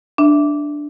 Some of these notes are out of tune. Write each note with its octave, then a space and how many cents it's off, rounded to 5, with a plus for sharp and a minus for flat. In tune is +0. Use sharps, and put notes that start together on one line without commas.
D4 +0 E5 +0